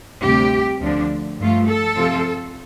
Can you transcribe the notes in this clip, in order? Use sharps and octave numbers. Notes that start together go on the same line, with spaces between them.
D2 C3 G3 G4
D2 D3 F3 D4
G2 F3 A3 F4
A4
C3 F3 C4 F4